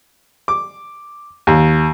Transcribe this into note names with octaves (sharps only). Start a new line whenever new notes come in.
D6
D#2